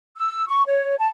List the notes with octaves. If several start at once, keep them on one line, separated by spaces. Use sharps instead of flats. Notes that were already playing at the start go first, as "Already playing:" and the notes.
E6
C#6
C#5
A5